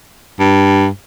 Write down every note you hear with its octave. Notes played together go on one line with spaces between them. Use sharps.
G2